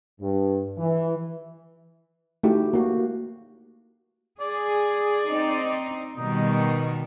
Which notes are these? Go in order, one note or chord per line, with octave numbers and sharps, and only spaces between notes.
G2
E3
A3 D#4 E4 F#4 G4
A#3 F#4
G#4 D5
C4 D#4
B2 D#3 G3 D#4